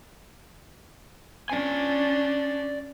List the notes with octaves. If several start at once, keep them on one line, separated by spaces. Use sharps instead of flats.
C#4 D4 D5 G#5